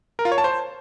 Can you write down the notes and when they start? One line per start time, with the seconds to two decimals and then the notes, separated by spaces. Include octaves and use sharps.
0.19 A#4
0.25 F4
0.32 C#5
0.38 A5
0.44 C5